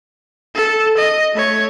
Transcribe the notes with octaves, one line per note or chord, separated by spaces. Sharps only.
A4
D#5
A3 C#5